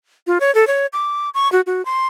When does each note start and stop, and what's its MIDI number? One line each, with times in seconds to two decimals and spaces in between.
0.27 0.38 65
0.40 0.53 73
0.55 0.67 69
0.67 0.86 73
0.93 1.30 86
1.34 1.50 85
1.52 1.61 66
1.67 1.84 66
1.85 2.07 84